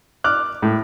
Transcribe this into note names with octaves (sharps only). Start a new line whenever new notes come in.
D6 F6 F#6
A2